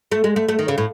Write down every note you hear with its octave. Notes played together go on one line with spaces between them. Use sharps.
A3
G#3
A3
A3
D#3
C#3
A2